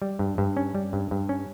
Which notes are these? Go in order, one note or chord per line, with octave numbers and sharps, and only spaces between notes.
G3
G2
G2
C#4
G3
G2
G2
C#4